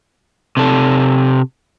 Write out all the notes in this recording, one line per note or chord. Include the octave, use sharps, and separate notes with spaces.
C3 A4